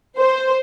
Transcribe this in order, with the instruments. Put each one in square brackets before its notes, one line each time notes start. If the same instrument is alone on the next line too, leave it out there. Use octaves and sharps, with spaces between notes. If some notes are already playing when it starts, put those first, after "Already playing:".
[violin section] C5